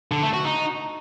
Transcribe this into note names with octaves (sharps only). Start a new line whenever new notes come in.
D3
A3
F#4
D#4